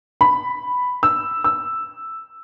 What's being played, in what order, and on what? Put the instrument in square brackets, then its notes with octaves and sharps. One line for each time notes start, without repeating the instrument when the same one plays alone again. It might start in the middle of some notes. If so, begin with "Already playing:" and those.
[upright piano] B5
E6
E6